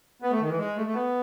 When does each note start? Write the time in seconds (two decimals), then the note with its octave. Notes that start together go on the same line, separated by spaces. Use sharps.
0.22 B3
0.31 A3
0.40 D#3
0.49 E3
0.58 G#3
0.76 A3
0.86 A3
0.94 B3